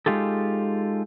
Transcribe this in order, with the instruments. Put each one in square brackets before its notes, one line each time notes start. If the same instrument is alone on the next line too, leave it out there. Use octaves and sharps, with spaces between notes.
[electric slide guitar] G#3 D#4 F4 G4 A4